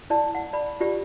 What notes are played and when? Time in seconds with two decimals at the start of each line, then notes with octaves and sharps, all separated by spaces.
0.10 E4 D5 A5
0.35 F#5
0.53 D5 B5
0.81 F4 G4 D5